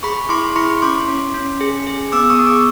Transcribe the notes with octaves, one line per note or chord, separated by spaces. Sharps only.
G#4 B5 C#6
E4 C6 D6
E4 B5 C#6
C#4 C6 D6
C#4
C#4
G#4
G#4
B3 D6 E6
C#6 D#6
B3
D6 E6